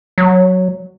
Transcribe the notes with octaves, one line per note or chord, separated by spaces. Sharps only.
F#3